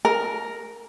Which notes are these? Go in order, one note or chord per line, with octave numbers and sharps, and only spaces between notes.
A#4